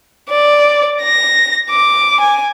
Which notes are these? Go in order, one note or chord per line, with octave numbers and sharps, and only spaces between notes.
D5
A#6
D6
G#5